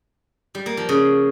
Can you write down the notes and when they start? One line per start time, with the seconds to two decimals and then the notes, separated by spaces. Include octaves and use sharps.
0.55 G3
0.66 A#3
0.77 F3
0.89 C#3